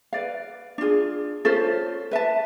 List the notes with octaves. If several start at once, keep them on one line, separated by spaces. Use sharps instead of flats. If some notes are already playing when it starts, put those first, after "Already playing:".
B4 D5 F5
D4 F4 G#4
C#4 F4 A4 C5
B4 E5 A5